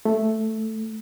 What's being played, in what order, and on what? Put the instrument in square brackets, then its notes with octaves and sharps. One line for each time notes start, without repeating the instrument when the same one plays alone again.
[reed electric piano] A3